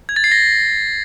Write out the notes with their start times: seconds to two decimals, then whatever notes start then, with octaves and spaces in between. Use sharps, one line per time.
0.09 G#6
0.16 A6
0.24 C7
0.32 A#6